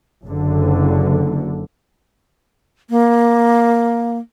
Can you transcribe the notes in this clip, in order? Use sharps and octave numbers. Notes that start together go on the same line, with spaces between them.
F#1 D3
A#3